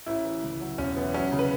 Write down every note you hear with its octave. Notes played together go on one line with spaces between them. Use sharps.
A1 E4
E3
C#2
F#3
E1 C#4
E3 B3
F#3 C#4
C#3
B4